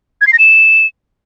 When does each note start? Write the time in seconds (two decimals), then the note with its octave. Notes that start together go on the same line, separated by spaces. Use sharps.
0.21 G#6
0.27 C7
0.33 A#6
0.39 E7